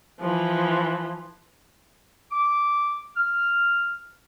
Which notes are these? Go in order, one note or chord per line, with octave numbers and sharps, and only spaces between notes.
E3 F3
D6
F6